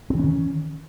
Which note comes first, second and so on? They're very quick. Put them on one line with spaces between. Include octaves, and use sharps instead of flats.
C4 E3 C#4 D#3